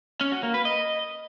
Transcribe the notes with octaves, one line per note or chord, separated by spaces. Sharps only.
C#4
F#4
A#3
B4
D#5